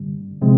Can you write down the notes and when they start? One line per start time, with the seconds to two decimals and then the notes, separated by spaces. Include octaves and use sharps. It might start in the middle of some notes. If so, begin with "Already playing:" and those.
Already playing: G2 D3 G3
0.41 C3 F3 G#3 C4